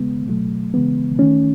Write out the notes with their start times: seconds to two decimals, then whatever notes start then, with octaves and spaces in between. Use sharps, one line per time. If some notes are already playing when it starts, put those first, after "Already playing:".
Already playing: C#3 G#3 B3
0.28 B2 F#3 A3
0.74 C#3 E3 G#3 B3
1.18 D#3 A3 C#4